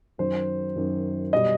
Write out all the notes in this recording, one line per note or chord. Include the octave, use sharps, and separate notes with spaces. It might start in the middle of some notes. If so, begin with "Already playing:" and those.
F#2 D#3 F#3 C5
F#2 D#3 F#3
B2 G3 D#5